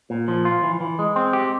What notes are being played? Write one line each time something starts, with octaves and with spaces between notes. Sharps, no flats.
A#2
F3
F4
E3
E3
G#3
C4
G4